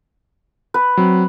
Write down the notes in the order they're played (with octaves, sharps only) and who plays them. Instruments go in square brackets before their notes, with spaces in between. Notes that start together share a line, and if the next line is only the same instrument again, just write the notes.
[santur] B4
[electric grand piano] F#3 C4